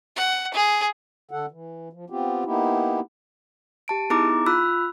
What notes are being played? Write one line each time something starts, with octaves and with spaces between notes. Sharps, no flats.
F#5
G#4
D3 A4 F#5
E3
F3
B3 C4 F4 G4
A#3 B3 D#4 E4 G4
G4 A5 D7
B3 D#4 E4 G#4 A#5 D6
F4 B5 E6 F#6